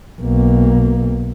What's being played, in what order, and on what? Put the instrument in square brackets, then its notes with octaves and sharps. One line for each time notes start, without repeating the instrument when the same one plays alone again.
[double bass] B1 A#3